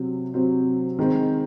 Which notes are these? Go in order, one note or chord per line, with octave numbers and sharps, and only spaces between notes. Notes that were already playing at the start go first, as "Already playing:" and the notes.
Already playing: C3 F#3 C4
C3 F#3 C4
D#3 G#3 C4